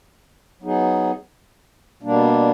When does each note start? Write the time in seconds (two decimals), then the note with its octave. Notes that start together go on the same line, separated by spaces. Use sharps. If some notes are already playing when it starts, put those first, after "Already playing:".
0.62 F#3 B3 D#4 G#4
2.03 B2 G3 A#3 D4